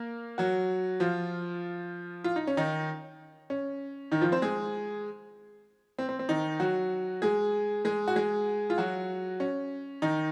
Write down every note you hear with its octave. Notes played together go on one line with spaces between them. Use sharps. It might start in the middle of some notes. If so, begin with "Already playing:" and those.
Already playing: A#3 A#4
F#3 F#4
F3 F4
F4
D#4
C#4
D#3 D#4
C#4
D#3 D#4
F3 F4
C4 C5
G#3 G#4
C4
C4
C4
D#3 D#4
F#3 F#4
G#3 G#4
G#3 G#4
F#4
G#3 G#4
F4
F#3 F#4
C#4
D#3 D#4